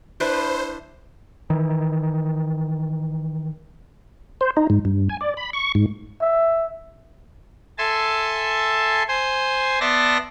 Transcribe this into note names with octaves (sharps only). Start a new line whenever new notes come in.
D4 E4 B4 C5
D#3 E3
C5
D#4
G#2
G2
G#5
D5
B5
C#6
G#2
E5
A4 E5 G#5 A5 C6
C5 G#5 C6
B3 D5 E5 A5 C6 A#6